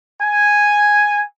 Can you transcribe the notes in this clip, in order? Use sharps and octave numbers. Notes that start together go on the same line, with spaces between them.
G#5